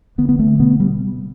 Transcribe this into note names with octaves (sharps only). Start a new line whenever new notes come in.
D3 B3
B3
D3 A3
B2 B3
G3